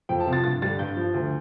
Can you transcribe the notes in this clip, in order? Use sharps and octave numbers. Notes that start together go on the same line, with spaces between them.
F2 G5
A5
C3 F3
A6
G2 A6
D3 G3 A6
G2 G6
F3
D2